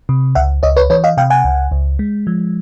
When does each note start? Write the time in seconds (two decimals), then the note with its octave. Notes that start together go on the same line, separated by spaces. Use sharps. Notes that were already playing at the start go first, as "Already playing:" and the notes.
0.09 C3
0.35 C#2 E5 F#5
0.63 C#2 C#5 D#5
0.76 B4 C#5
0.90 E3 B4 C#5
1.04 D#5 F5
1.17 C3 F5 G5
1.30 F#5 G#5
1.44 C#2
1.71 C#2
1.99 G#3
2.27 F3